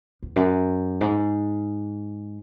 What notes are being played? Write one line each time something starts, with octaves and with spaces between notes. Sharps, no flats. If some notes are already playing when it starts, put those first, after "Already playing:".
E2
F#2
G#2